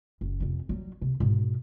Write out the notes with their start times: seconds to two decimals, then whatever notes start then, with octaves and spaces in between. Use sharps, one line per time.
0.21 F#1
0.40 C2 F2
0.69 F#3 G3
1.02 C3
1.20 G#2 B2